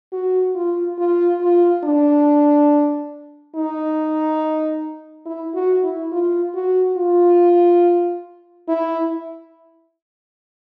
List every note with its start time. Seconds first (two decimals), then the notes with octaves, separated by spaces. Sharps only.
0.12 F#4
0.55 F4
0.98 F4
1.41 F4
1.84 D4
3.55 D#4
5.26 E4
5.54 F#4
5.83 E4
6.12 F4
6.54 F#4
6.97 F4
8.68 E4